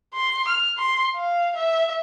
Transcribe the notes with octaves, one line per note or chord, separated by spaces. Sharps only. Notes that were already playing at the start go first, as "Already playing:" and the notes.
C6
F6
C6
F5
E5